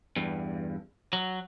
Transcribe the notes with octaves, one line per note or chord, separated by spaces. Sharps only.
E2 G2
F#3